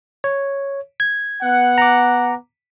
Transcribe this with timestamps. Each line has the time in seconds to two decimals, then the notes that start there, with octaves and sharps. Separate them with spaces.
0.24 C#5
1.00 G#6
1.42 B3 F#5
1.78 A#5 D6